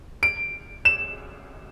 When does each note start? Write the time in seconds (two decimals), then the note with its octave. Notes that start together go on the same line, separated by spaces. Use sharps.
0.23 D7
0.85 E7